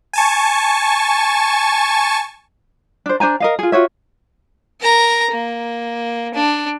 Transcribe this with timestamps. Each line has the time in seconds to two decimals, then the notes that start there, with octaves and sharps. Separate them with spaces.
0.13 G#5 A5 C#6
3.06 D4 C5
3.20 D4 C5 G#5 A#5
3.40 A#4 D#5 F5
3.59 F4 G#4
3.72 F4 F#4 C#5 E5
4.81 A#4 A#5
5.31 A#3
6.34 D4